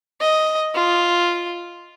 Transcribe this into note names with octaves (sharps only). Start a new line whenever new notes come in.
D#5
F4